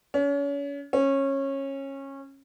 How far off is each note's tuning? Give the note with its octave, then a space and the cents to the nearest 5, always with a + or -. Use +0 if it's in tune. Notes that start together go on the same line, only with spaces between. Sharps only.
C#4 +35
C#4 -20